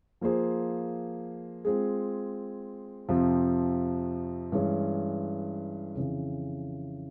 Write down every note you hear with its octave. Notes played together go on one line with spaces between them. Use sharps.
F3 A#3 F4 G#4 C5
G#3 C4 F4 G#4
F2 C3 F3
G2 E3 G#3 C#4
F2 C#3 E3